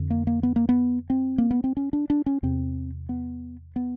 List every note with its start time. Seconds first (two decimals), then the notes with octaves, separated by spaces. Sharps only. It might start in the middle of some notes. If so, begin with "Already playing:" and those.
Already playing: F2 D3
0.10 A#3
0.27 A#3
0.43 B3
0.56 A#3
0.69 B3
1.10 C4
1.38 A#3
1.51 B3
1.64 C4
1.77 C#4
1.93 D4
2.10 D4
2.26 C#4
2.43 E2 C3 C4
3.09 B3
3.76 B3